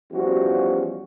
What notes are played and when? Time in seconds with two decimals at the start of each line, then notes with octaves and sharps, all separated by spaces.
0.12 E2 F3 G3 C#4 F#4